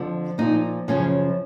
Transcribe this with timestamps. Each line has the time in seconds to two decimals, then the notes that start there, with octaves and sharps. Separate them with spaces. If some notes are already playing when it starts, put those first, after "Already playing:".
Already playing: F2 D3 F3
0.38 A#2 F3 D#4
0.88 F#2 C#3 F3 C#4